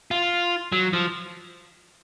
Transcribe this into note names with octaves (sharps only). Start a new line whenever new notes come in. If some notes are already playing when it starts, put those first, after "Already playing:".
F4
F#3
F3